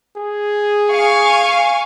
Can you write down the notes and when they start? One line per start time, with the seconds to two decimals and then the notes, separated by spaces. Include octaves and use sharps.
0.17 G#4
0.89 F5 G#5 C#6